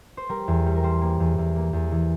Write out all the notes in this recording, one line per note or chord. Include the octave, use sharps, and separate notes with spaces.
C5
G3 A#4
E2
G3
A#4
G3 C5
A#3
E2
E2
A#3
E2
E3